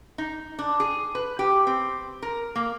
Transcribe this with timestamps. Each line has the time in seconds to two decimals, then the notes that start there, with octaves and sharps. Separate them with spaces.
0.18 D#4
0.59 D4
0.80 G#4
1.15 B4
1.39 G4
1.67 C4
2.22 A#4
2.56 A#3